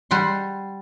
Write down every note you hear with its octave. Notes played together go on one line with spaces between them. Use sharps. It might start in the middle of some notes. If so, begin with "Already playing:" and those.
G3 F#5 C6